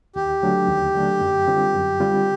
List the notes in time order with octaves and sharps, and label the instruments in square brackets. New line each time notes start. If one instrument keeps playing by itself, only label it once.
[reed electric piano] D#2 [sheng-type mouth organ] G4
[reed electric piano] D3 F#3 A3 D4
D#2
D3 F#3 A3 D4
F#2
D3 G3 C4 F4
F#2
D3 G3 C4 F4